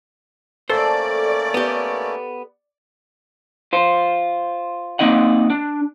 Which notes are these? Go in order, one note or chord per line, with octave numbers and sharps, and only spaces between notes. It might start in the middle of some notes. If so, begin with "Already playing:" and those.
A3 A#3 C#4 A4 C5 D5
B3 G4
F4 C5
A#3 C4 D#4 D#5 F#5
D4